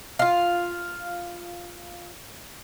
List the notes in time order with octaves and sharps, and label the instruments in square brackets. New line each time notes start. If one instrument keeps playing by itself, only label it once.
[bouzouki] F4 F5